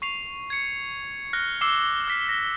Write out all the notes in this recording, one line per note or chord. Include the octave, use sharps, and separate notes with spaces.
C#6 C7 F7
G#6 C#7
F6 F#6 A#6
D6 E6 C7 E7 G7
F6 B6 C7
A#6